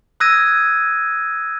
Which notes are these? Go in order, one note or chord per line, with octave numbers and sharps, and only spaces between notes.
D#6 E6 F#6 G#6 A#6 D#7